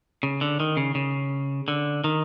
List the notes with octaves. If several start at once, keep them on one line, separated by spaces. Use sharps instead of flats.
C#3
D3
D#3
C#3
C#3
D3
D#3